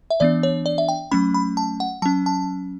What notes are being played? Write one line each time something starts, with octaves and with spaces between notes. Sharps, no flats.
E5
E3 B3 D4 D5
C#5
D5
E5
G5
F#3 A3 C#4 B5
B5
A5
F#5
F#3 C#4 A5
A5